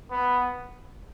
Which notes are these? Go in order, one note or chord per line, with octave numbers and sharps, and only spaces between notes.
B3